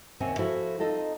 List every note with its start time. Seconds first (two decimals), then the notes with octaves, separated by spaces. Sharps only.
0.20 D#2 C3 C4 C#4 F#5 G#5
0.39 F3 E4 F#4 A4 C5
0.79 C4 D#4 F4 A4 D#5